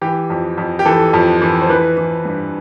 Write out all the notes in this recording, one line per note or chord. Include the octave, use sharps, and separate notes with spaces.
E3 G4
F2
F2
G4
E3 A4
F2
E3
C5
E3 B4
E3
G2